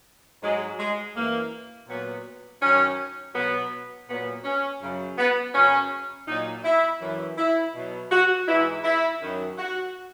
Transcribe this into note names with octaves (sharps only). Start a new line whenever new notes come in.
G#2 F#3 G#3
G#3
F#2 E3 A#3
A#2 F#3 B3
F#2 D#3 F#3 C#4
B2 F#3 B3
A#2 F#3 B3
C#4
F#2 C#3 F#3
B3
F#2 C#3 F#3 C#4
A#2 F#3 D#4
E4
F#2 E3
E4
B2 F#3
F#4
G#2 E3 E4
E4
F#2 D#3 F#3
F#4